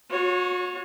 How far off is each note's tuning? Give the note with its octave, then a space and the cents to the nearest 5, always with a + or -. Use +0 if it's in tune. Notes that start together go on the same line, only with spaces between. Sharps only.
F#4 -40 C#5 +0